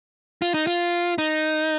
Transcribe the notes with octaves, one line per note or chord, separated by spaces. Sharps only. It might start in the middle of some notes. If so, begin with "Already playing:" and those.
F4
D#4
F4
D#4